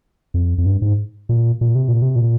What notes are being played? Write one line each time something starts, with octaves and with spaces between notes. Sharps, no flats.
F2
F2
G2
G#2
A#2
A#2
C3
A#2
C3
A#2